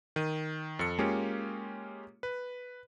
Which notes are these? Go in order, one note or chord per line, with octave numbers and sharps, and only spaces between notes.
D#3 D#7
F2 A4 C#7
G#3 A#3 C#4 F4 G4
B4